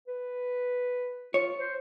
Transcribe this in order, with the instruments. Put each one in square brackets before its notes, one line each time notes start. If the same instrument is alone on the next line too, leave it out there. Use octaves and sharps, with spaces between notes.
[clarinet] B4
[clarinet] F4 [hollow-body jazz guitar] C#5
[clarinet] C5